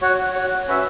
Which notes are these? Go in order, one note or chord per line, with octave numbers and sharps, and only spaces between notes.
F#4 C#5 F#5
F#4 C#5 F#5
C#4 F#4 B4 E5